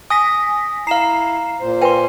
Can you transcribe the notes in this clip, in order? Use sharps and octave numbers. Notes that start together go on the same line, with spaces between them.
G#5 D#6 A#6 B6
E4 F5 A#5 C7 E7
A#2 C5
B4 G5 G#5 C6